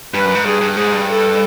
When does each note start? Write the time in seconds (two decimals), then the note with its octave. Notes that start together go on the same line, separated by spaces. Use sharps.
0.14 G2 B4
0.25 F#2
0.35 G#2
0.45 G2 G#4
0.61 G2
0.77 G#2 G#4
0.92 G2
1.09 A4